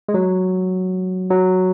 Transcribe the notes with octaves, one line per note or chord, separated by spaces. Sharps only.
G#3
F#3
F#3